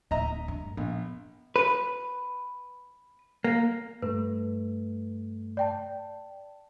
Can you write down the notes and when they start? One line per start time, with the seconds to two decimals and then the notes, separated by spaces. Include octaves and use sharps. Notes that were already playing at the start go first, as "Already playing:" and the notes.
0.11 D1 D#5 E5 A#5
0.48 G2
0.77 A#1 B3
1.56 B4
3.44 A#3
4.02 G2 A3 B4
5.57 D5 G5 A5